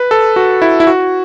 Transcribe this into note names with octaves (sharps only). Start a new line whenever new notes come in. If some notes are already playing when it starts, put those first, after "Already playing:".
Already playing: B4
A4
F#4
E4
E4
F#4